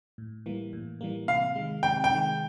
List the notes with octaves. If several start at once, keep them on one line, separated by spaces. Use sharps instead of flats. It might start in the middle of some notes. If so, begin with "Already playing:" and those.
A2
E3 G3 A#3
A2
E3 G3 A#3
C3 F5
D#3 G#3
C3 G5
G5
D#3 G#3